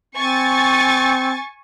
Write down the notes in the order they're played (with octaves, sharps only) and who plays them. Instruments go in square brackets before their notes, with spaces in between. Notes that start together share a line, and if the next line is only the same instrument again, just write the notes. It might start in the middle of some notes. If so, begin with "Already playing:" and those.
[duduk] C4 [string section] G#5 C#6 A6